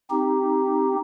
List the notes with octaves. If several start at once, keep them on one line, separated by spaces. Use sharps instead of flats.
C4 D#4 G4